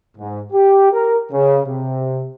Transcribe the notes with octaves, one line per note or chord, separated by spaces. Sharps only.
G#2
G4
A#4
C#3
C3